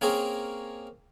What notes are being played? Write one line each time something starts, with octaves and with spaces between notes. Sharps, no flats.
A#3 C4 C#4 G#4 A#4